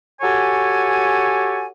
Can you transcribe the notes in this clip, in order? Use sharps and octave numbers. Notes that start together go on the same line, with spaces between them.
F#4 G4 A4 C#5 G#5